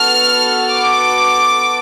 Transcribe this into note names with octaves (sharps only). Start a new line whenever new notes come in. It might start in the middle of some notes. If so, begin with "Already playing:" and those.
Already playing: B3 F#4 A4 F6
D6